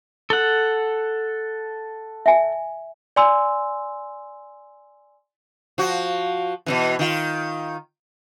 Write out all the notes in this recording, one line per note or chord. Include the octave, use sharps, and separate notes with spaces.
A4 F#5
E5 G#5
D5 G#5 C6 E6
F3 F#4
B2 D3 E3
D#3 F4